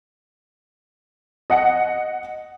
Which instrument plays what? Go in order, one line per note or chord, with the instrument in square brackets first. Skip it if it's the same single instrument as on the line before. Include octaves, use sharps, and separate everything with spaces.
[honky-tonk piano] D#5 F#5 C#7